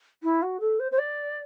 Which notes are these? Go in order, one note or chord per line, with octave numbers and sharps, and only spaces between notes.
E4
F#4
A4
C5
C5
D5